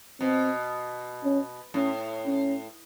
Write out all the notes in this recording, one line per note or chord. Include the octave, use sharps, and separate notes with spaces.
B2 C4
C#4
A2 C#4
C#4